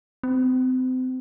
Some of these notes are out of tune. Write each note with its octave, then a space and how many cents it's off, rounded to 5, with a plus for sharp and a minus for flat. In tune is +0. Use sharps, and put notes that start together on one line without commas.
C4 -35